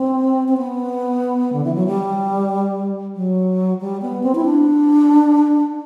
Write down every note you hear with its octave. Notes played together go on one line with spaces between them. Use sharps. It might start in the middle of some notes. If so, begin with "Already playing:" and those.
Already playing: C4
C4
B3
D3
E3
F#3
G3
F#3
G3
B3
C4
E4
D4